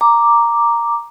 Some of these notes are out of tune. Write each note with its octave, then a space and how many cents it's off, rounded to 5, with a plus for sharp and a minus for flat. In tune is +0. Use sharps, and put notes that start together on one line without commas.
A#5 +0 D6 +0